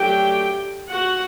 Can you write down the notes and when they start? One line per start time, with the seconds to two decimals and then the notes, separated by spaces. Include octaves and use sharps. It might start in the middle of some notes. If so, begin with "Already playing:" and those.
Already playing: F#3 A3 D4 G4 G5
0.90 F#4 F#5